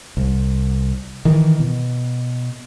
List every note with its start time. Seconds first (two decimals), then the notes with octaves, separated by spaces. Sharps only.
0.17 C2
1.25 D#3 E3
1.60 B2